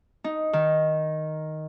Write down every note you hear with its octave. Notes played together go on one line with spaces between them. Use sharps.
D#4
D#3